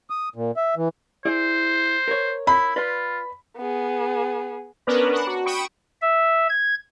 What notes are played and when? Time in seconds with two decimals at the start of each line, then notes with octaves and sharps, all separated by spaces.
0.10 D#6
0.36 A#2
0.57 E5
0.76 E3
1.25 E4 G#4 C5 D5
2.08 A#4 C#5
2.47 E4 B5
2.76 F4 B4 D5 C6
3.57 B3 G#4
4.87 B3 C#4 D4 A#4 B4 A#5
5.11 D4 F#5
5.27 F#4
5.45 G5 B5 C#6 D#6 D7 E7
6.01 E5
6.49 G#6